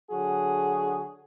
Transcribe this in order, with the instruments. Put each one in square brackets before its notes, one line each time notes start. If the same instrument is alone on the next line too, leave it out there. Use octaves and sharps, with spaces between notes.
[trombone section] D3 F#3 F#4 G#4